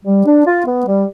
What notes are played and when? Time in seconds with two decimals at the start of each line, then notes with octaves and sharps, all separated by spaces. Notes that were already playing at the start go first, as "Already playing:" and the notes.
0.05 G3
0.25 D4
0.45 F4
0.66 B3
0.85 G3